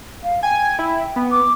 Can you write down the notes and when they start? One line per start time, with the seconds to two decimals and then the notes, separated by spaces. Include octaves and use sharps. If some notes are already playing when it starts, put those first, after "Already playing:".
0.24 F5
0.43 G5 G#5
0.79 E4
1.16 B3
1.31 D6